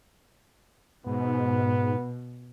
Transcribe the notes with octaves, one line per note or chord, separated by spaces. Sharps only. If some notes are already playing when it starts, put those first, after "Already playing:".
G#2 B2 B3